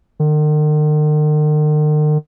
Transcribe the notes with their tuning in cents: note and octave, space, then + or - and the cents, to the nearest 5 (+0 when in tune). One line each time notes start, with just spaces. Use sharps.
D#3 -45